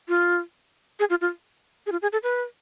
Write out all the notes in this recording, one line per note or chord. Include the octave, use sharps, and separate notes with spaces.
F4
G#4
F4
F4
G#4
F4
G#4
A4
B4